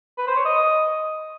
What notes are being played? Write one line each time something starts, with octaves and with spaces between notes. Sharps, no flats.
B4
C5
C#5
D#5